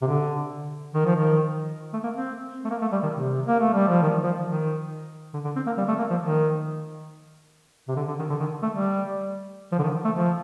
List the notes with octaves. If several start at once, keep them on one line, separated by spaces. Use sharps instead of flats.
C3
D3
D#3
F3
D#3
A3
A#3
C4
A3
A#3
A3
G3
D#3
C3
A#3
A3
G3
F3
D#3
F3
D#3
D3
D3
C4
A#3
G3
A3
A#3
F3
D#3
C3
D3
D3
D#3
D3
D#3
A3
G3
F3
D3
D#3
A3
F3